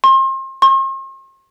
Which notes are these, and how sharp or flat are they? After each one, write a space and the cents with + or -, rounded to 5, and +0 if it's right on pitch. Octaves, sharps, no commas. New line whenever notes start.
C6 +35
C6 +45